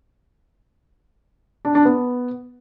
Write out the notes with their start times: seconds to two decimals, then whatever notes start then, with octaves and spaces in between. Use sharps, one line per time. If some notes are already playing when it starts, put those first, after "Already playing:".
1.65 D4
1.75 D4
1.85 B3